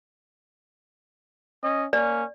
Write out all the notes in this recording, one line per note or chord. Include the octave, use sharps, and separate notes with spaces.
C#4 D#5
A#3 C#4 D5